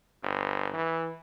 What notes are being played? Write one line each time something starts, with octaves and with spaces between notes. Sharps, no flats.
G1
E3